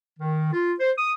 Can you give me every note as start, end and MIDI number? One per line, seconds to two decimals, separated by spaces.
0.19 0.50 51
0.52 0.72 65
0.78 0.90 72
0.97 1.13 87